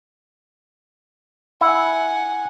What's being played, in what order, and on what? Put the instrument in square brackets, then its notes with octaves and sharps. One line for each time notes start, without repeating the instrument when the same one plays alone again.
[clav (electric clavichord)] E4 [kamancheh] F#5 G#5